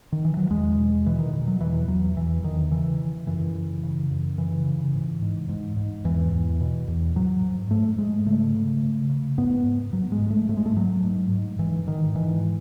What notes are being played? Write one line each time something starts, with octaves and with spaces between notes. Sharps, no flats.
D#3
E3
F#3
E2 G#3
B2
B2 E3
D#3
B2
F#3
E2 E3
E2 F#3
E2 E3
E2 D#3
C#3 E3
C#3
F#2 E3
C#3
C#3
F#2
C#3 E3
C#3
G#2
G#2
G#2
G#2
E2 E3
E2
B2
E2
G#2 F#3
G#2
G#2 A3
G#2 G#3
C#3 A3
C#3
C#3
C#3
G#2 B3
G#2
G#2 F#3
G#3
G#2
A3
G#2 A3
G#3
A3
G#2 F#3
G#2
G#2
G#2 E3
G#2 D#3
G#2 E3